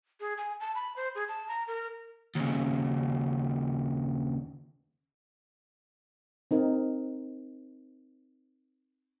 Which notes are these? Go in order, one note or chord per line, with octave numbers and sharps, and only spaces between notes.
G#4
G#5
A5
B5
C5
G#4
A5
A#5
A#4
D#2 C#3
C4 D#4 A#4